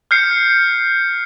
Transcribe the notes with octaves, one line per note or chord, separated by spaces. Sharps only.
F6 G6 C7 C#7